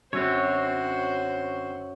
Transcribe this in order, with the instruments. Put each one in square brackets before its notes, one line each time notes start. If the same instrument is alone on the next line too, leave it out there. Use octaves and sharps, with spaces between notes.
[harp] F#2 [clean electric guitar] D3 C4 [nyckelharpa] F#4 C5 [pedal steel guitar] C#5